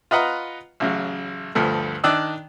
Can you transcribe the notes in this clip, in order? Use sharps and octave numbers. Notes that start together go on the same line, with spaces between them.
F4 B4 D#5 F#5 A#5
A1 C#3 F#3
D2 G2 F3 A3
D#3 D4 D5 D#6 E6 F#6